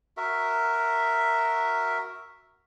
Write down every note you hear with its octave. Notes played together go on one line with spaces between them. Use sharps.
F#4 A#4 E5